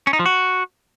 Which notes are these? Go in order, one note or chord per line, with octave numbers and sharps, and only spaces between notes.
C#4
D#4
F3
F#4